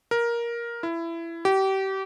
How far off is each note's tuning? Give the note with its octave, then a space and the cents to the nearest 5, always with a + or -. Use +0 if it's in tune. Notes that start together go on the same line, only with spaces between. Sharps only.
A#4 +10
E4 +20
G4 -30